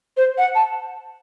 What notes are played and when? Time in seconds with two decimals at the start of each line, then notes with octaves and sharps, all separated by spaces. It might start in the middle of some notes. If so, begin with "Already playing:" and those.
0.17 C5
0.38 F#5
0.55 A5